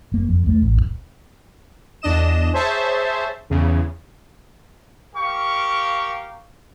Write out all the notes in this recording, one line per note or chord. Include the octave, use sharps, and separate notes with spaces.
F#1 A#3
F2
D#2 G#3 A3
A1
D1 E2
E2 D4 D#5 E7
G#4 C5 C#5 E5 A5
E2 C#3
G4 A#4 F5 C#6